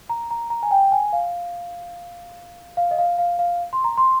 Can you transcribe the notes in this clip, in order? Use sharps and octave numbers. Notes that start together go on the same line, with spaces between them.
A#5
A#5
A#5
G#5
G5
G#5
F5
F5
D#5
F5
F5
F5
C6
A#5
C6